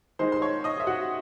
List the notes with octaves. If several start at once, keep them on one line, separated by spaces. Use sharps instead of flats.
D#3 G#3 D#4 C5 C6
C6
C#5 C#6
D#5 D#6
E5
F#4 F#5